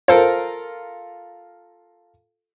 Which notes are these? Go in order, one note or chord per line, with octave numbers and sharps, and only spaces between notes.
F4 A4 A#4 C5